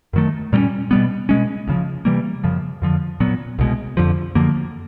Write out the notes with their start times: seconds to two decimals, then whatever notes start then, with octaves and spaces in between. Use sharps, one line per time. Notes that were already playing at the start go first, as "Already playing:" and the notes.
0.13 F#2 D#3 F#3 A3
0.53 A#2 G3 A#3 C#4
0.91 B2 G3 B3
1.29 B2 G#3 C#4
1.68 D2 C#3 F3
2.05 C3 E3 G3 A#3
2.44 F#2 C#3 F3
2.82 F2 D3 F3
3.20 A#2 F#3 B3
3.59 C2 B2 G#3
3.97 F2 D3 F3
4.35 F#2 D3 F3 A#3